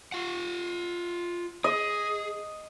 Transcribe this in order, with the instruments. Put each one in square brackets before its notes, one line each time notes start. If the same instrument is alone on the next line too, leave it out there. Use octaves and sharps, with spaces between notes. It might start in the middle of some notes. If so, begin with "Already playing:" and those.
[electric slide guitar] F4 F#5
[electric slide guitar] G#4 [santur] D#5